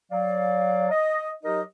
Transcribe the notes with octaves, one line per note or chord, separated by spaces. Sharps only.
F#3 D5 F5
D#5
F#3 D#4 G4 A#4 D#5